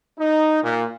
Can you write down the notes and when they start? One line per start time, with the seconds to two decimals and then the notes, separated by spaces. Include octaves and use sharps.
0.19 D#4
0.63 A#2